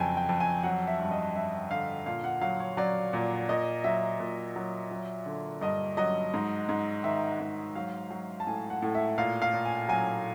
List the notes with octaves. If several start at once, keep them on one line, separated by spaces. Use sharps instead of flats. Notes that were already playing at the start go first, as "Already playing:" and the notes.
Already playing: F2 C#3 F#3 G5 G#5
G5
F2
G#5
F#3 F#5
E5
G2
D#5
G2 E5
D3 F5
A#2 F5
F#5
F#3 F5
C#5
F#3 D5
A#2
A#2 D#5
F#3 E5
A#2
F#3
F#3
D3
G2 D#5
F#3 D#5
G#2
G#2
D#3 E5
G#2
F#3 F5
F#3
A5
A2 G#5
F#5
A2
E5
A#2 F5
F5
A#2
G#5
F#3 G#5